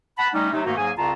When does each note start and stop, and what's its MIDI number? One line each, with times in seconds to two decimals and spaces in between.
0.18 0.29 78
0.18 0.29 81
0.18 0.29 83
0.34 0.52 55
0.34 0.52 57
0.34 0.52 61
0.34 0.52 63
0.52 0.64 48
0.52 0.64 54
0.52 0.64 57
0.52 0.64 63
0.65 0.76 44
0.65 0.76 51
0.65 0.76 57
0.65 0.76 58
0.65 0.76 63
0.65 0.76 66
0.77 0.91 44
0.77 0.91 54
0.77 0.91 58
0.77 0.91 68
0.77 0.91 80
0.97 1.12 36
0.97 1.12 49
0.97 1.12 60
0.97 1.12 65
0.97 1.12 81
0.97 1.12 82